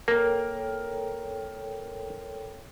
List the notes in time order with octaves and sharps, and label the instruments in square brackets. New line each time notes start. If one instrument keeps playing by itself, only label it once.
[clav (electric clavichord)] A#3 [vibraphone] A4 C#5 G5 [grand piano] A#4